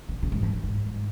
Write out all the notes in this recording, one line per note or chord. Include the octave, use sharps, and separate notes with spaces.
C#3
C#3
G#2
F2
F2
G#2
G#2